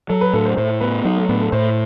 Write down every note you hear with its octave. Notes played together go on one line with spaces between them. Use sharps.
F#3 A4
B4
A2 A4
C5
A2 C5
B3 B4
F#3 D#4
A3
A2 B3
A4
A2 C5